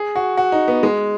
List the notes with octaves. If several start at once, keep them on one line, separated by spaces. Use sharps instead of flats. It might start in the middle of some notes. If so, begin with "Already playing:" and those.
Already playing: G#4
F#4
F#4
D#4
B3
G#3